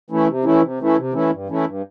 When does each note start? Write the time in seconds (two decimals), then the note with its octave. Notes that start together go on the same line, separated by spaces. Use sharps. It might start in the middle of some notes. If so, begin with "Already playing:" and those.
0.10 E3 A3 C#4 E4
0.28 C3
0.44 E3 A3 C#4 E4
0.62 C3
0.79 E3 A3 C#4 E4
0.96 C3
1.14 E3 A3 C#4 E4
1.30 G2
1.47 E3 A3 C#4 E4
1.65 G2